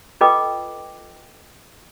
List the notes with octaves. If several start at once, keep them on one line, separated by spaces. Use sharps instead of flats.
F4 A4 B4 D#5 G5 D6